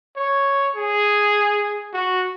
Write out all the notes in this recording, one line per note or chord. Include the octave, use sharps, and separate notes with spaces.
C#5
G#4
F#4